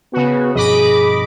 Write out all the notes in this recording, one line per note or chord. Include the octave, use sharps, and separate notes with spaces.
C#3 B3 F#4
G2 B2 F3 G#4 D#5 B5 D6